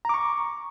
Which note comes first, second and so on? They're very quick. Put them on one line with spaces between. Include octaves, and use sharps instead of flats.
A#5 D6 C#6